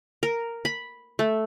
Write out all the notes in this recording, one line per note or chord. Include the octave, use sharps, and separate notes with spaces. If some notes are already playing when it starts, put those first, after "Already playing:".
A#4
B5
A3